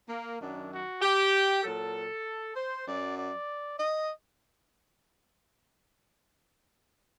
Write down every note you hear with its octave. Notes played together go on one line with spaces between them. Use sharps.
A#3
F#2 D#3 F#3 D4
F#4
G4
A#2 F#3 A4
C5
F#2 F#3 D5
D5
D#5